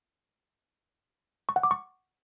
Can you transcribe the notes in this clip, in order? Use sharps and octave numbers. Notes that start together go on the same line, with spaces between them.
C#6
F#5
D6
C#6